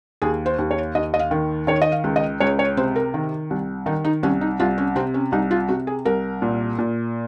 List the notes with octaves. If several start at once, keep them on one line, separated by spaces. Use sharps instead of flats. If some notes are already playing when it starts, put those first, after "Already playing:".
D#2 G#4
C5
D#2
C#5
D#2 D#5
D#5
F5
D#3
D#3 C#5
D#5
F5
C#2
D#5
C#2 C#5
C#5
C3 C5
A#4
D#3
C2
D#3 D#4
D#4
C2 C#4
D#4
C2 F4
C#4
C3 C4
C#4
C2 D#4
F4
C3 F#4
G#4
C2 A#4
A#2
A#2